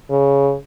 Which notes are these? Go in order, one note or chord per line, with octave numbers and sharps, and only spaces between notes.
C#3